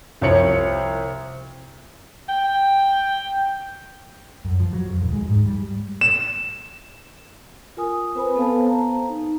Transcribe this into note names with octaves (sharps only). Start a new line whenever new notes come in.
C2 F3 C5 C#5 C#7 F#7
G5
F#2
F3
F#3
F2
D#1
G#3
G#2
G3
E7
F4 A#4 G#5 D#6
C4 B4 C5 G#5 B5
B3 A4 C5 F5 G#5 A5
A#5
D#4